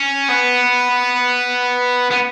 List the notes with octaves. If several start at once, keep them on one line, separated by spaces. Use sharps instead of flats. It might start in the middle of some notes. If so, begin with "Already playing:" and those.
Already playing: C#4
B3
B3